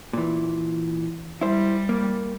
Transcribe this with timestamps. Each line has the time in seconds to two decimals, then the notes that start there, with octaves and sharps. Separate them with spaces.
0.13 A#2 E3
1.41 G3 E4 C5
1.89 A#3